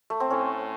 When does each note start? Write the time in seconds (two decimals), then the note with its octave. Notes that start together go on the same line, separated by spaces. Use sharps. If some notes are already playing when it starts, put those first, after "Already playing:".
0.10 A3
0.20 C4
0.30 A2 C#4